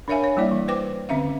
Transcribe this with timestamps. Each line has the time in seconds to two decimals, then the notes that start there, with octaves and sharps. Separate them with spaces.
0.08 D4 A#4 C#5 E5 F5 G#5
0.24 C#5
0.37 G3 A#3 E4 D5
0.51 E3
0.68 B4 C5 G5 D6
1.09 D3 C4 C#4 E5 F5